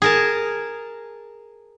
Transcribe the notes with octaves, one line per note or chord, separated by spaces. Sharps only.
G#4 A#4 A5